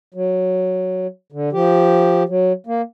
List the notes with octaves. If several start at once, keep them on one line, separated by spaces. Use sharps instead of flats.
F#3
D3
F3 G4
F#3
A#3